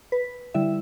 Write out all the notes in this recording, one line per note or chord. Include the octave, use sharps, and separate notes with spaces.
B4
D3 G3 E4 E5